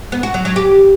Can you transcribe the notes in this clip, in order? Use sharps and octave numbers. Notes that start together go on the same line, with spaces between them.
B3
F#4
F#3
F#3
G4